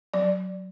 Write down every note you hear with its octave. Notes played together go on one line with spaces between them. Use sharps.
F#3 D5